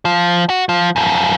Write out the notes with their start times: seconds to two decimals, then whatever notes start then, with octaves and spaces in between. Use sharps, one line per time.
0.05 F3
0.50 F#4
0.69 F3
0.96 F#2 F3